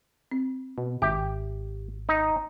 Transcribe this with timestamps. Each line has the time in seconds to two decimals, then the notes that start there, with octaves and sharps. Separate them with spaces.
0.31 C4
0.78 B2
1.02 G#1 G4 E5
2.09 D#4